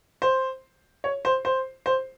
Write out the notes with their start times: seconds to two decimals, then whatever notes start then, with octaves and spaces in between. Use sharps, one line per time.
0.22 C5
1.04 C#5
1.25 C5
1.45 C5
1.86 C5